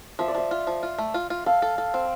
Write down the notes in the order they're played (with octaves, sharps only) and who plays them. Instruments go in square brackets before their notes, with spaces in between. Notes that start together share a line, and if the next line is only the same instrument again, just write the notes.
[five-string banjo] F3 [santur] E5
[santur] D5
[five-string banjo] F3 [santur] E5
[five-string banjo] F4
F3
F4
A3
F4
F4
[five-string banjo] A4 [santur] F5
[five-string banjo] A4
A4
C4